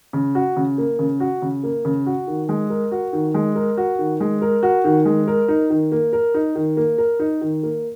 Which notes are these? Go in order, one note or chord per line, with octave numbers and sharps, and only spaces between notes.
C#3
F#4
C#3
A#3
C#3
F#4
C#3
A#3
C#3
F#4
D#3
G#3
A#4
F#4
D#3
G#3
A#4
F#4
D#3
G#3
A#4
F#4
D#3
G#3
A#4
D#4
D#3
A#3
A#4
D#4
D#3
A#3
A#4
D#4
D#3
A#3